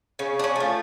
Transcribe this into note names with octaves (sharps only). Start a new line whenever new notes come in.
C#3 C#4
D4
C#4
F3 A3